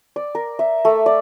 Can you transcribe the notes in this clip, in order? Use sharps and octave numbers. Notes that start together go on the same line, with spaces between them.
D5
A#4
E5
A3
D5